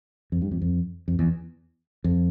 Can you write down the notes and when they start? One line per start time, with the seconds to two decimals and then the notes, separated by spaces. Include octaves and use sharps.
0.32 F2
0.42 G2
0.51 F2
0.62 F2
1.08 F2
1.19 E2
2.04 F2